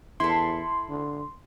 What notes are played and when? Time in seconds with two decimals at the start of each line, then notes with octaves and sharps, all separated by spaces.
0.20 E2 E4 A4 C6
0.89 D3